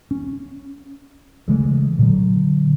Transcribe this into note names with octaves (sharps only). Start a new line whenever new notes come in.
C#4
C#3 E3 G#3 A3
A#2 D3 F#3